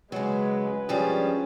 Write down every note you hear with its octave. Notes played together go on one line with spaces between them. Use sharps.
C#3 F#3 G#3 B4
G2 F3 G3 C#4 G#4